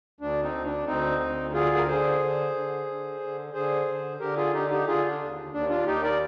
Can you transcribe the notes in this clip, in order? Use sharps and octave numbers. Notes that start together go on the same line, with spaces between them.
D2 D4
C4 D#4
D2
D4
D2 C4 D#4
D2
D3 F4 G#4
A#4
D3 G#4 C5
D3
D3
D3
D3
D3 G#4 C5
D3
D3 G4 A#4
F4 G#4
D3 D#4 G4
D#4 G4
D3 F4 G#4
D4
D#2
D#2 D4
D4 F4
D#2 D#4 G4
A#4 D5